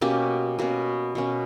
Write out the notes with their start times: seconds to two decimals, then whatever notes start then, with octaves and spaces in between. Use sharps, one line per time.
0.01 B2 A#3 C#4 G4
0.59 B2 A#3 C#4
1.15 B2 A#3 C#4